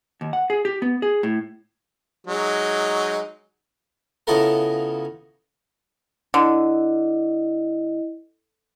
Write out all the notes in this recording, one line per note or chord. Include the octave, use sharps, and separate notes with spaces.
D#2
F#5
G#4
G4
B3
G#4
A2
F#3 G#3 D#4
C#3 B3 E4 F4 A4 A#4
D3 E4 D#5